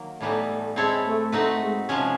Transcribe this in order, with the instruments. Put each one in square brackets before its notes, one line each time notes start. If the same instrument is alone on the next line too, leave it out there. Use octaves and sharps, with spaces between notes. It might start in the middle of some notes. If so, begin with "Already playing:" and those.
Already playing: [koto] D#3 F#3 A#3
[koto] A2 E3 G3 B3 D#4 [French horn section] A3
[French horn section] A3
[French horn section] G#3 [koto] C4 E4 A4 C#5 E5
[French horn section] A3
[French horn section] A3 [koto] C4 D#4 F#4 B4
[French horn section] G#3
[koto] C3 F3 G#3 C#4